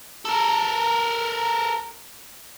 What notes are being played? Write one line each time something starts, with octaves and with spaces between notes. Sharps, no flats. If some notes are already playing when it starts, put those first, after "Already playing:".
A4 A#4